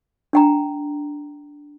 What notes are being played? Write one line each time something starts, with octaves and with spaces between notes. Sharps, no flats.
D4 G5 A#5